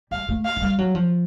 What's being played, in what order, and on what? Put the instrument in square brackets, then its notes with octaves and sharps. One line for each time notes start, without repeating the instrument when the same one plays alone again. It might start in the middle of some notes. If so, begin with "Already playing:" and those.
[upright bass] G3 [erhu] F5
[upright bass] A3
[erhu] F5
[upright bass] F#3
G3
F#3
F3